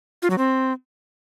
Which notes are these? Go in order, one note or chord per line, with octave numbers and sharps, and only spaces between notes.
F4
F#3
C4